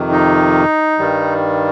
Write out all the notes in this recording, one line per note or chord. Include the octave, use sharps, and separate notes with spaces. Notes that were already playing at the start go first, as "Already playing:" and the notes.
Already playing: F2 C3 D#3
D#4
G2 D#3 G3